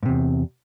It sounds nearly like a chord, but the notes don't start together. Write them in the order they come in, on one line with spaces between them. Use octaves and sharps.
G#2 C3 E2